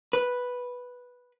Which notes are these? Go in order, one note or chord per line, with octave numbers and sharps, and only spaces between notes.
B4